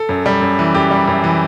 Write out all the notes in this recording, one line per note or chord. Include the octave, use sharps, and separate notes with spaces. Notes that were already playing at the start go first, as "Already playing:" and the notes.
Already playing: A4
F#2
G3
F#2
E3
F#2 G4
G3
F#2
E3